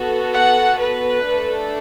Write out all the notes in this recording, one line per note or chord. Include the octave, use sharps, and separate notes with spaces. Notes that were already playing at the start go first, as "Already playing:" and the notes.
Already playing: B3 F#4 A4
F#5
B4
A3 D4 A4